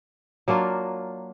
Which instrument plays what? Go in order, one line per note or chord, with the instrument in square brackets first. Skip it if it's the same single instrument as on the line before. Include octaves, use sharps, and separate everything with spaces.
[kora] F#3 A#3 D4 F4